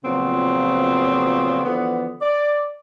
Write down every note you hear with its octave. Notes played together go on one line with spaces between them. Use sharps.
A#2 C#3 F3 F#3 B3 C4
D3 E3 F3 B3
D5